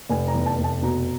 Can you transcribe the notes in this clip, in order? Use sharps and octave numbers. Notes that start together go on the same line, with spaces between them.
F1 G#5
A#5
E2
A5
F1
A5
B2 A#5